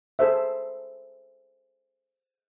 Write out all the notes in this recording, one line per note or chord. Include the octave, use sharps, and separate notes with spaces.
G#4 A4 C5 E5